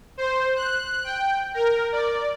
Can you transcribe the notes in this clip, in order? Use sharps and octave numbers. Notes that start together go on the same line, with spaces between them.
C5
F#6
G5
A#4
D5